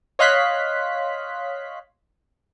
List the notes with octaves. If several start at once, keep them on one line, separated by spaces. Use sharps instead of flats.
C#5 D#5 F5 C6 F#6 B6